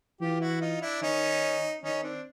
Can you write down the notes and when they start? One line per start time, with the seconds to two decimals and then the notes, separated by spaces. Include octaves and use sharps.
0.21 E3 F4 G4
0.41 E4 F#4
0.61 D#4 F4
0.81 D4 E4
1.02 D#3 C#4 D#4
1.83 D#3 C#4 D#4
2.03 C4 D4